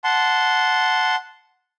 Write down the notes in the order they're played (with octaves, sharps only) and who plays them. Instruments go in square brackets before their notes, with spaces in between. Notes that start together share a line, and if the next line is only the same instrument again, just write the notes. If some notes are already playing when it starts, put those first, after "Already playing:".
[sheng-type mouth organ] F#5 A5 C6